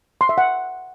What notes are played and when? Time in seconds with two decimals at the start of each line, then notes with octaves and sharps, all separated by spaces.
0.21 C6
0.29 E5
0.38 F#5